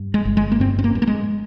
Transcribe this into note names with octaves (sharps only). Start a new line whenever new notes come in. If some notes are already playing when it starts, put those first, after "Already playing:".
Already playing: G2
G#3
G1
G#3
A#3
G2 C4
C4
A#3
G2
A#3
G#3